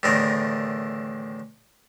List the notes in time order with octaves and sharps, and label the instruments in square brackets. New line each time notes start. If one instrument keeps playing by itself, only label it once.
[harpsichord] E2 A2 D3 D#3 A#4